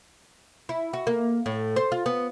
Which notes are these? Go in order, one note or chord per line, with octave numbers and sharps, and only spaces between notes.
E4
F#4
A#3
A2
C5
F4
B3